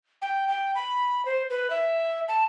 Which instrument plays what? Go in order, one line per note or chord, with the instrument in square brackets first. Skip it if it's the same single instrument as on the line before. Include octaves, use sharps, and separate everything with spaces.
[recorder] G5
G5
B5
C5
B4
E5
A5